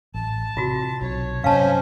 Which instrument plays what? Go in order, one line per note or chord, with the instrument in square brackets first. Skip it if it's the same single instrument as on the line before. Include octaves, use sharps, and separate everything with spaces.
[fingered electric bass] A1 [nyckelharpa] A5
[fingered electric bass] C3 [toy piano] F4 F#4
[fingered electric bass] B1 C3 [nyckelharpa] C#5
[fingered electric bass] G2 C3 F#3 [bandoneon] C#4 [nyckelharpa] C5 D#5 [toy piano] F5 A5